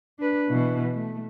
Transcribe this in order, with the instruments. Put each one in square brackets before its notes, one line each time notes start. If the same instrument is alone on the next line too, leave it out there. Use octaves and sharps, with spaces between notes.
[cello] D4 B4
B2 E3
A3